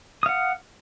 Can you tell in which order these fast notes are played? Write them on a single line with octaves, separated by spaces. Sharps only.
D#6 F5 F#5